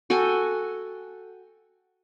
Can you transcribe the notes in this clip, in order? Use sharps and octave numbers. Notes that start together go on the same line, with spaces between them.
F#4 A4 G5 G#5